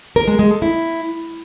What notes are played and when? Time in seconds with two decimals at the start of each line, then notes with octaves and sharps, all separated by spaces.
0.16 A#4
0.28 G#3
0.39 G#3
0.51 A4
0.62 E4